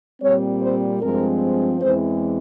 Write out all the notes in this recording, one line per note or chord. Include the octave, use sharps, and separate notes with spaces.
A#2 G3 C4 C#5
C5
G2 F3 G#3 C4 A#4
E2 E3 G#3 C4 C5